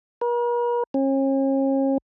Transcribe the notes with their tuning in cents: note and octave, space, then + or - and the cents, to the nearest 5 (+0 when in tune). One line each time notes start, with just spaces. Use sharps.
A#4 +45
C#4 -40